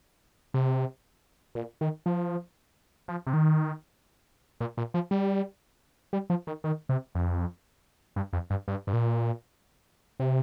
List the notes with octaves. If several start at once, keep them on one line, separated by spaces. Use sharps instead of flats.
C3
A#2
D#3
F3
F3
C3
D#3
A#2
A#2
F3
G3
G3
F3
D#3
D#3
C3
F2
G2
F2
G2
G2
G2
A#2
C3